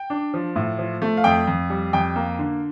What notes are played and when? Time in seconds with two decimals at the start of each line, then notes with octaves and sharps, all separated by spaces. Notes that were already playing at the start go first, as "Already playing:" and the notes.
Already playing: G5
0.10 D4
0.34 F3
0.56 A2
0.79 F3
1.02 A3
1.17 F5
1.24 F2 G5
1.47 F2
1.70 G3
1.93 F2 G5
2.16 A#3
2.39 D3